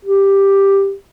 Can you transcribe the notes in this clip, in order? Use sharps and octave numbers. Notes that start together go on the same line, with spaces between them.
G4